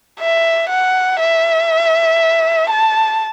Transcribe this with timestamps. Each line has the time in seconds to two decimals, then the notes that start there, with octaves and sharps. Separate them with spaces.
0.20 E5
0.69 F#5
1.19 E5
2.70 A5